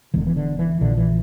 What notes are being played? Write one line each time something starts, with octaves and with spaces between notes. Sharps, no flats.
E1 E2 D3 E3
E3
D3
E3
A#1 A#2 D3
E3